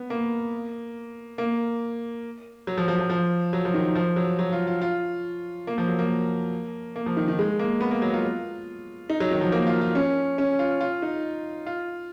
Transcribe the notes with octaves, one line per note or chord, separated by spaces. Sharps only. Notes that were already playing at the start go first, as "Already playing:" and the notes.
Already playing: B3
A#3
A#3
F#3
F3
F3
F3
F3
F#3
F3
D#3
F3
F#3
F#3
F4
F4
F4
A#3
F3
F#3
A#3
A#3
F3
D#3
D#3
G#3
A#3
B3
A#3
F#3
F4
D#4
F#3
D#3
F3
A#3
F4
F4
C#4
C#4
F4
F4
D#4
F4